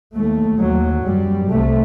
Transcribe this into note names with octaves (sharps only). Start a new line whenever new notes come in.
D#2 A3
D#2 F#3
F#2 G3
C2 C3 A3